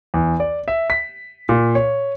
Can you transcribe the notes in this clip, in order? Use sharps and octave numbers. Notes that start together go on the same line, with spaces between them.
E2
D5
E5
B6
A#2
C#5